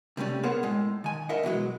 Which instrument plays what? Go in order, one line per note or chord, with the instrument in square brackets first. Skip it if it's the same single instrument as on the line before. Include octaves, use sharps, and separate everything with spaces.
[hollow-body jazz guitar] C3 G3 A3 C#4
B3 G#4 A#4 C5 C#5 F#5
A2 G#3
D#3 G#5
A#4 D#5 E5 F#5
B2 E3 F#3 G#3